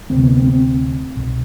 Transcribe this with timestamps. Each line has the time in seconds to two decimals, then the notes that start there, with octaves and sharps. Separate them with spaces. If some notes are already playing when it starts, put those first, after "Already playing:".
0.10 D2 C3 C4
0.23 B3
0.37 C4
0.49 C4
1.15 C2 B2